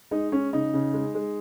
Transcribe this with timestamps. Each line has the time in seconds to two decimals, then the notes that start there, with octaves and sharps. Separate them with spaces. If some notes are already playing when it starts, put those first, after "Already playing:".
0.11 G#3 D#4
0.32 G#3 C#4
0.53 C#3 D#4
0.74 C#3
0.94 G#3
1.15 G#3